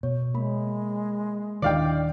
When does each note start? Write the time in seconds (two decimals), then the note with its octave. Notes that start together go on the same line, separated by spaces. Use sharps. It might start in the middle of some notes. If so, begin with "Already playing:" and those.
0.03 B2 C#5
0.34 G#3 A#3 B5
1.62 D#1 D#3 D4 E4 D5 D#5 F5 G5